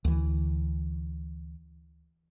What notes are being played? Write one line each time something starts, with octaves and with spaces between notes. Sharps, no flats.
D2 E3